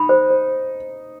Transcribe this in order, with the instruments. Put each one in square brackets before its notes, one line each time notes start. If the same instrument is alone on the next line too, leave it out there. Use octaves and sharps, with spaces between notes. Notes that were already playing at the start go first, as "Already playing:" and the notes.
Already playing: [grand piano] D#4 [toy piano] B5
[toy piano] C5
C5